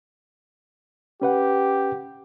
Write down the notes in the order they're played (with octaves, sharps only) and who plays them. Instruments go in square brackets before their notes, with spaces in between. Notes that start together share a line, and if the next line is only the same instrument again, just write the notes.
[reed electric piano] C#4 B4 F#5 [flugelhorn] G4